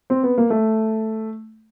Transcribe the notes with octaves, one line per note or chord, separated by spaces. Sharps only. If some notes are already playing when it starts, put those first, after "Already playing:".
C4
B3
A#3
A3